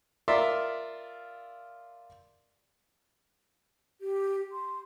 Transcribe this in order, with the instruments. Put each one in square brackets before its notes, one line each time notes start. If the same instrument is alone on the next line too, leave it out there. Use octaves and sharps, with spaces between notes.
[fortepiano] F4 A#4 D5 E5 C6
[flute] G4
C6